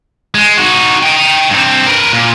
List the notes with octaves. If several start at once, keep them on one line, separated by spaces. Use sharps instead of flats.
G#3
D#4 F#4
D#5 G5
G2 C4
A#4 B4
A#2